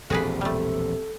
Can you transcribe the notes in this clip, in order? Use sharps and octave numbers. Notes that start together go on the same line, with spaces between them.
E1 A#1 C3 F3 F#4 G#4 A4 B4
G3 A3